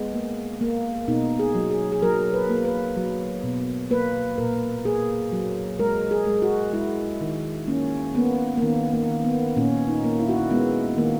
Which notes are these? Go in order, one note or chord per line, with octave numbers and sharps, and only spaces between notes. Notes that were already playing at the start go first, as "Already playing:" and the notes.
Already playing: G#3 B3
A#3
A#3
B2 D#4
G#4
F#3
G#4
G#4
F#3 A#4
B4
A#3
B4
F#3
B2
A#3 B4
A#2 A#4
A#3 G#4
F#3
G#3 A#4
G#4
G#3
F#4
G#3 E4
D#3
A#3 C#4
A#3 B3
A#3
D#3 B3
A#3
D#3
B3
A#2 C#4
D#4
A#3
E4
F#4
E4
G#3 B3
D#3 A#3